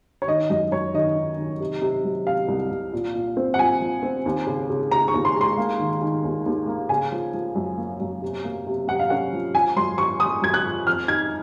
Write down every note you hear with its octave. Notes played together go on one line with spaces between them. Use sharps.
C#5
D#3 D#5
F#2 D#5
F#2 C#5
D#3 D#5
D#4
D#3
C3
C3
F#3
C3 F5
C2
C2
A#2
A#2
C4
F#5
F3 G#5
F3
C4
D#2
C#3
C#3
C#3 A#5
C#6
D#2
C6
G#3
C6
A#3
D#3
D#3
D#2
D#2
A#3
C#3 G#5
F3
F3
F#2
A#3
F#2
C3
A#3
C3
C3 F#5
F5
C#4 F#5
F3
F3 G#5
F#2 C6
F3 C#6
F3 D#6
F#2 G#6
F#6
F3
F2 F6
D#4 G#6